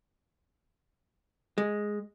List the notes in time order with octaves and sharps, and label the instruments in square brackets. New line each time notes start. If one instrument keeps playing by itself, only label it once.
[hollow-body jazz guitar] G#3